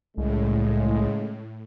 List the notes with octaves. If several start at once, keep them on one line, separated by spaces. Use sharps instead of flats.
C2 A2 C#3 G#3